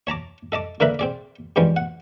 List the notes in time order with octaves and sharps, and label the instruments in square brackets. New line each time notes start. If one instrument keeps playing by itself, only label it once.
[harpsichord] C#5 A5 A#5 D6
A4 D#5 A5 D6
D3 A#3 A#4 B4 E5 B5
C4 G#4 D5
G2 E3 F3 G3 G#3 C#4
F#5